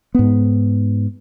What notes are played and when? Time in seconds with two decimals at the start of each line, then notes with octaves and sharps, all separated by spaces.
0.15 G#2 B3